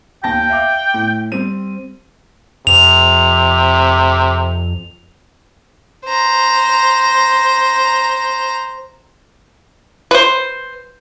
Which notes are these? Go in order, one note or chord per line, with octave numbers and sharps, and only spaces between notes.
D#2 G5 A5 A#6
E5 F5 D6
A2
G3 C4 D#7
F2 C3 F7
C5 A#5
B4 C5